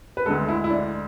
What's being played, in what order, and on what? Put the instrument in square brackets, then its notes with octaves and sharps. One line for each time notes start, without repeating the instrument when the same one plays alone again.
[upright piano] B4
D2 D3 G#3 A4
E4
E4
D4